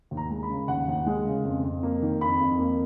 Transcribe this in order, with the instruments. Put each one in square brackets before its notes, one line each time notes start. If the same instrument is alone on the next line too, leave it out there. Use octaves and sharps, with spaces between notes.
[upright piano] D#2
A#5
G#3
B5
C#3
D#2 F#5
D#2
G#3
C#3
F2
F2
A#3
D#3
F2 B5
F2
A#3